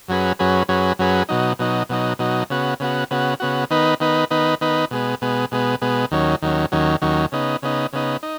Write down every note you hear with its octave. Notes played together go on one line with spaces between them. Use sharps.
F#2 F#3 C#4 G#4 B4
F#2 F#3 C#4 G#4 B4
F#2 F#3 C#4 G#4 B4
F#2 F#3 C#4 G#4 B4
B2 F#3 D#4
B2 F#3 D#4
B2 F#3 D#4
B2 F#3 D#4
C#3 B3 F#4
C#3 B3 F#4
C#3 B3 F#4
C#3 B3 F#4
D#3 B3 D#4 B4
D#3 B3 D#4 B4
D#3 B3 D#4 B4
D#3 B3 D#4 B4
B2 G#3 B3
B2 G#3 B3
B2 G#3 B3
B2 G#3 B3
D#2 D#3 F#3 C#4
D#2 D#3 F#3 C#4
D#2 D#3 F#3 C#4
D#2 D#3 F#3 C#4
C#3 B3 D#4
C#3 B3 D#4
C#3 B3 D#4
D#4